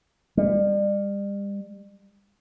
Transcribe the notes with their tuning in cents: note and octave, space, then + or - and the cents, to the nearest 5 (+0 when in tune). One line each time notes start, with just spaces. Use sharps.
G3 +35